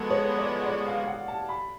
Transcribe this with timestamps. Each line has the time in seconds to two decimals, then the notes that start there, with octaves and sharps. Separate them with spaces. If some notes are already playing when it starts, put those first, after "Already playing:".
Already playing: F3 G#3 B3 F#4 A4
0.10 C#5
0.38 D5
0.66 D5
0.87 F5
1.07 F#5
1.28 A5
1.49 B5